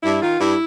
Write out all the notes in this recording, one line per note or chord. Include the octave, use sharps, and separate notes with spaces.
G2 E4
D#3 F4
G2 E4